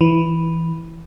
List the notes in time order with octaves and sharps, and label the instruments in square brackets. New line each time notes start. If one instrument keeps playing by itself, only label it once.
[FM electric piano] E3